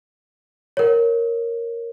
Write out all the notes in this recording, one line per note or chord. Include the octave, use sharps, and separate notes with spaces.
A#4 C#5